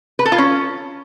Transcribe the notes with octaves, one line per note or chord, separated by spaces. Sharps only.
B4
A4
F4
C#4